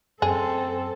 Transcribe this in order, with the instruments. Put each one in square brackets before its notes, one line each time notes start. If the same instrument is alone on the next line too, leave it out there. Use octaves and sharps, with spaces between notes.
[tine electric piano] F#2 [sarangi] C4 [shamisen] G#4 [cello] A4